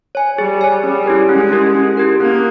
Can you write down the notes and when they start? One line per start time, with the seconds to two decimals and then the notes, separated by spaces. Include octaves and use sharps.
0.15 C#5 G#5
0.38 G3 G#4
0.61 C#5 G#5
0.83 G3 C#4
1.06 E4 G4 A#4
1.28 G#3 C#4
1.52 E4 G4 A#4
1.74 C#4
1.97 E4 G4 A#4
2.20 A#3 C#4